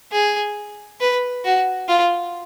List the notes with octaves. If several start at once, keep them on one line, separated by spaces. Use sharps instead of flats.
G#4
B4
F#4
F4